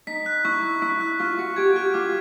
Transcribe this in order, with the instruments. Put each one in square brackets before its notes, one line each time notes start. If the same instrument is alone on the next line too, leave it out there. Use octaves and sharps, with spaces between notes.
[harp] D#4 [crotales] B6
[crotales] F#6
[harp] E4 [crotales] C#6
[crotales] C#6
[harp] E4 [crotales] B6
[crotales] F#6
[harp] F4 [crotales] C#6
[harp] F#4 [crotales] C#6
[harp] G4 [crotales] G#6
[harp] G4 [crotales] F6
[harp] F4 [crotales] D6